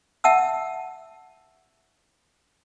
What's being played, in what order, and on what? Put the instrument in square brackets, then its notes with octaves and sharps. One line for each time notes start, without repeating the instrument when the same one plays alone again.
[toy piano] E5 F#5 A5 E6